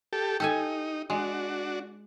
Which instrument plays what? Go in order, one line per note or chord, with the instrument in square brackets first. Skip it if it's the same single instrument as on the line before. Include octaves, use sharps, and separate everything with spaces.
[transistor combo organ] G4 A4
[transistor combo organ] D#4 [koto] G4 A4 G#5
[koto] G#3 [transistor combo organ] D4 F#4